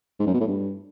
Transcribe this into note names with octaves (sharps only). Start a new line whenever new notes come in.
G#2
F#2
B2
A2
G2